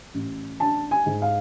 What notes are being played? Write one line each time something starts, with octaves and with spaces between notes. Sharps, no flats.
A1
D4 A5
G#5
G#2
F5